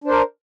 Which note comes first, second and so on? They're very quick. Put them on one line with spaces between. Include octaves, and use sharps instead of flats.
D4 C5 A#4